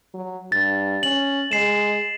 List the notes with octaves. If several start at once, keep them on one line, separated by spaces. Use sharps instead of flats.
F#3
G2 A6
C#4 F#7
G#3 C7 E7